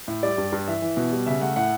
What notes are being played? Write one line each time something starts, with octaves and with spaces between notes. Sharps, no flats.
A2
G3 D5
G2
G2
E3 E5
E3
B2
G3
C#3 E5
A3 F#5
A2 F#5